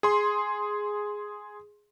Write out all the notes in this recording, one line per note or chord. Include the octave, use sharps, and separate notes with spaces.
G#4 C6